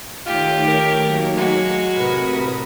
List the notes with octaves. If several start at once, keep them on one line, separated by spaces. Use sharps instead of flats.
D#3 A3 F4 G4 C#5
A#4
F#3 A#3
G#3 F#4
A2 C3 A#4 B4 D#6